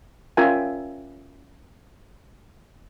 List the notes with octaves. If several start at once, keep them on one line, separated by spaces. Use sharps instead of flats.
C#4 F4 A#4 E5 G5 G#5